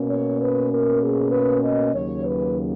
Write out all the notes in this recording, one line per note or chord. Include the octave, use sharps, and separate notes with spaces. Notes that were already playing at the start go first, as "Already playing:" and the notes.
Already playing: B2 A#3 C#4
C#5
B4
A#4
G#4
B4
D#5
D#2 C#3 F#3 C#5
B4